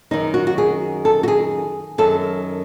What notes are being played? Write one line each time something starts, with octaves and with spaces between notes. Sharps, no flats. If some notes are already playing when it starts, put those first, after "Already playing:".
F#2 D#3 D#4
F#4
F#4
G#4
A4
F#4
G#4
F#2 D#3 A4